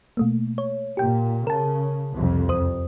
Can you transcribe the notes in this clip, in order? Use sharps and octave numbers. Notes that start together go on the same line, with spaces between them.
B2 A3 A#3
C#5
A#2 G4 G5
C#3 A#4 A5
C2 F2
E2 C5 D#6